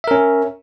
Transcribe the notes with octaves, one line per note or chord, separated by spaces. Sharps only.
C#4 A#4 E5